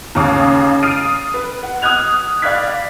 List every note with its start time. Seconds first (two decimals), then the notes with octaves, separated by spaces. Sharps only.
0.15 D#2 C#3 D6 D#6
0.83 D#6 F6 A6 C7 D7 D#7
1.34 B4
1.63 F#5
1.82 D#6 F6 F#6 G#6 F7
2.42 D5 F5 B5 F#6 G#6 B6